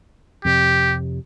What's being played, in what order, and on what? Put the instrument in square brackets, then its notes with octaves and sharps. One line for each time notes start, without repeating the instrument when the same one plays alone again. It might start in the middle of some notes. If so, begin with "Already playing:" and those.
[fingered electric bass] F2 C3 [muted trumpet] G4